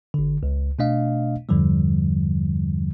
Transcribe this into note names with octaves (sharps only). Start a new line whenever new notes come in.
G#1 D3
C#2
B2 A3 D4 D#5 F5
E2 G2 D3 F3 G3